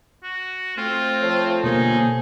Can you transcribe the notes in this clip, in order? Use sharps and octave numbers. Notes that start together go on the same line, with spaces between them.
F#4
A3 C4 F4
F3 A4 C#5
G1 B2 A#3 D#4 G#4